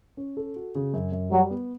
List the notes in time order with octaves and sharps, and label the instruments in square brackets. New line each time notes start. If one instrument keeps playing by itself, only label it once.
[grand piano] C#4
A4
F#4
C#3
F#2
F#2
[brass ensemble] F#3 [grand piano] G3
[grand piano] B3